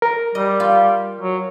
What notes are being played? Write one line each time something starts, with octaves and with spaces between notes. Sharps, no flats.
A#4
G3 D#5
F4
F#3